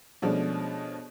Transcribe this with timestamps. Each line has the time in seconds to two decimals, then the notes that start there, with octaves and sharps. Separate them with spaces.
0.22 B2 F3 G#3 A3 C#4 D4